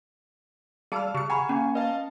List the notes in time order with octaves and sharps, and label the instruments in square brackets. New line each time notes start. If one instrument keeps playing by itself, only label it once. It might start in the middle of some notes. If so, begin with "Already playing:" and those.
[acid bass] G3 [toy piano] G#4 A5 [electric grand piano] F5 E6 F6
[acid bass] C#3 [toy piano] G4 [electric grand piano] F6 C#7
[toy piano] F#5 A#5 B5 [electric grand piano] G#5 C#6
[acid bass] A#3 [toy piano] C#4
[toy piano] B4 [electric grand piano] D#5 F5 A5